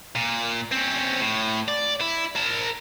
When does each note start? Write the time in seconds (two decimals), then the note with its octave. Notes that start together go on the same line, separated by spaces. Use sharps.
0.15 A#2
0.72 C4 C#4
1.21 A2
1.68 D5
2.01 E4
2.36 A#4 A5